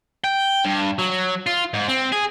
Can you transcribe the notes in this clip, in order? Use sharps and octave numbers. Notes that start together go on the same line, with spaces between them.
G5
G2
F#3
F4
G#2
C4
G#4